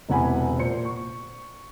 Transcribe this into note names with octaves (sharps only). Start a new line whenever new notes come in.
E1 E2 C3 F#5 G#5 B5
A#2 C5 C#7
C#6